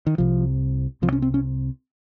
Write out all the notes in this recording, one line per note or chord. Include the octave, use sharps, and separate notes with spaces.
D#3
C2 C3 F3
C2 C3 F3
C#4
C4
C#4